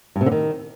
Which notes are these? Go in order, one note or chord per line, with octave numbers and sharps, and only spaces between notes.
G2
C3
D3
D#3